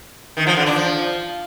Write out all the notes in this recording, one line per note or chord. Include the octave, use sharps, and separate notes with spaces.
D#3
F3
D3
D4
F3